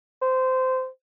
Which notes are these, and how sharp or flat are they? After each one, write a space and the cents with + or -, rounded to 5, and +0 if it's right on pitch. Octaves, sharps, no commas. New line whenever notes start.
C5 -20